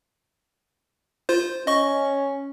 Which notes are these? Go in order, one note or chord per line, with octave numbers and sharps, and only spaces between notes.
F4 C5
C#4 D#5 C#6